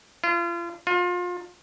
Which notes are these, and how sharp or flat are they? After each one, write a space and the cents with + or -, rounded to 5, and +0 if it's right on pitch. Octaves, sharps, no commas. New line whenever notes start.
F4 -35
F4 +30